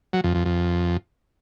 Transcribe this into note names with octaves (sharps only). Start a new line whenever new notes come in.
F#3
F2
F2
F2